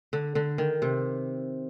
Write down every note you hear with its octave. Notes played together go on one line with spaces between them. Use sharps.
D3
D3
D#3
C3